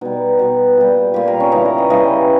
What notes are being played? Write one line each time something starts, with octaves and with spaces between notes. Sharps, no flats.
B2 G3 D#4
B2 G3
A#2 G3
A#2 G3 G4
A#4
C#4
C#3 E3 G3 D#4
A#4
D#5
C#3 E3 G3 D#5